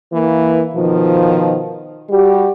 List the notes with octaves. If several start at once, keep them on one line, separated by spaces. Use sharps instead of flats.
E3 A#3
B2 D#3 F3
G3 F#4 G4